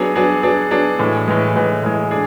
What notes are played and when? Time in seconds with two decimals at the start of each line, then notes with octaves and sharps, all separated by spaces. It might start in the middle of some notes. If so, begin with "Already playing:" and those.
Already playing: F#3 B3 D4 G#4
0.16 F#3 B3 D4 G#4
0.43 F#3 B3 D4 G#4
0.71 F#3 B3 D4 G#4
0.99 A2 E3 G#3
1.28 A2 E3 G#3
1.56 A2 E3 G#3
1.83 A2 E3 G#3
2.11 D4 G#4